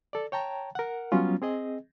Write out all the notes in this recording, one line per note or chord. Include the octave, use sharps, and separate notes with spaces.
A4 D5
C#5 G5 A5 A#5
A#4 F#5
F#3 G3 B3 C#4 F4
C4 G#4 D#5